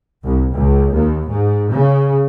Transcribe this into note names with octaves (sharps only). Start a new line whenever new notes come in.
C2
C#2
D#2
G#2
C#3